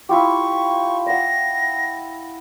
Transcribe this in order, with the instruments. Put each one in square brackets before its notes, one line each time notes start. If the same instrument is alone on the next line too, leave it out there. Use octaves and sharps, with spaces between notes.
[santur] E4 F4 G4 [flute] C#6
[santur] F#5 E6 [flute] A#6